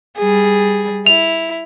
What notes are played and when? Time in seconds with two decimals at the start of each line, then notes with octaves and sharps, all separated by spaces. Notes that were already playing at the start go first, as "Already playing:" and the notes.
0.18 G3 G#4
1.06 E4 F7